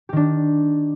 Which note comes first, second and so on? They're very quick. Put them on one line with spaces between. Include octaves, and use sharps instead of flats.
G4 D#3 D4